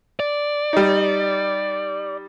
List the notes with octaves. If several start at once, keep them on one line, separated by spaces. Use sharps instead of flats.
D5
G3 D#4